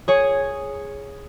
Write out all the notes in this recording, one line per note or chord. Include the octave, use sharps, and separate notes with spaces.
G#4 C#5